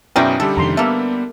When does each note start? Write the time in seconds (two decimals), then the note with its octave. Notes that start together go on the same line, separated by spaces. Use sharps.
0.16 F#2 B2 C#4 D#4 E4 G#4 D5 G5
0.40 D3 G3 G4 A4
0.57 F2 C3 D#3 A#5 C6
0.77 A#3 B3 A4 E5